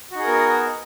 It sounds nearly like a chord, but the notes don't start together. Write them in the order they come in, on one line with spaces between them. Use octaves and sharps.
F#4 D#4 G#4 A#4 B3